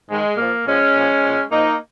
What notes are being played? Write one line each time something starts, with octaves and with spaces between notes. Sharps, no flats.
G#2 D#3 G#3
A#2 F3 A#3
A#2 F3 G#3 C#4
A#2 F3
A#2 F3
A#2 F3 A#3 D#4